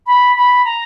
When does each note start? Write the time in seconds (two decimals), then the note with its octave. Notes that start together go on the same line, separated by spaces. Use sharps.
0.07 B5
0.36 B5
0.65 A#5